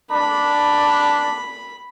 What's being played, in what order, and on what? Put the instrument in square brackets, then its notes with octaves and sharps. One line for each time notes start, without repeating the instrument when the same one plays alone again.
[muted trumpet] D4 [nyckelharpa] B5